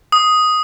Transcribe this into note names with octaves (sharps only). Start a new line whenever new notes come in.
D#6